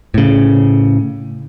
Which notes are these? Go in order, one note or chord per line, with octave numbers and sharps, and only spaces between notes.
A2 C#3